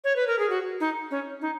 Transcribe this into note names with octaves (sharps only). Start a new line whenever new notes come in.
C#5
B4
A#4
G#4
F#4
D#4
C#4
D#4